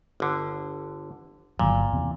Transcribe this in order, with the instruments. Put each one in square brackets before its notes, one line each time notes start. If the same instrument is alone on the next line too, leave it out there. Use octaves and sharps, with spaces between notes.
[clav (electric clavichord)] G1 D3
[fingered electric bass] G1 D#3 F#3 [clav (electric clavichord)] A#2
[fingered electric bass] E2 C3